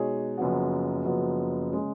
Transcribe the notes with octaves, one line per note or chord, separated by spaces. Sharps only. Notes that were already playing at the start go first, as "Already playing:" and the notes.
Already playing: B2 G#3 D#4 G#4 C#5
F#1 F#2 F3 B3 F#4
F#1 F#2 F3 B3 F#4
C#3 G#3